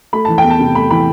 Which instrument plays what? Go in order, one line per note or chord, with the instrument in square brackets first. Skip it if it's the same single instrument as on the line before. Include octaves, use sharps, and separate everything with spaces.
[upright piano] A3 B5
E3 A5
G5
E2
A5
C3
A3 B5
E3 B5